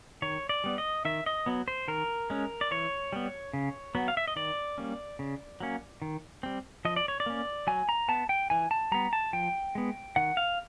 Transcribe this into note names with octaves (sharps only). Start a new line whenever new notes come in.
D#3 C#5
D5
G3 B3
D#5
D#3 E5
D#5
F#3 B3
C5
D#3 A#4
G#3 C#4
D5
E3 C#5
G3 B3
C#3
F#3 B3
F5
E5
D#5
D#3 D5
G3 A#3 C#4
C#3
F#3 A#3 C#4
D#3
G3 C4
F3 D#5
D5
C#5
D5
A#3 C#4
F#3 G#5
A#5
B3 A5
G5
E3 G#5
A5
G3 B3 A#5
A5
F3 G5
G#3 B3
D#3 F#5
F5